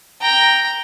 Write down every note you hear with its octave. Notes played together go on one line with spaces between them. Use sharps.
G5 A#5